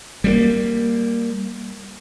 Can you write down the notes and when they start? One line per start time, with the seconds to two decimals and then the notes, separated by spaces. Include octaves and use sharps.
0.24 G3 G#3 A#3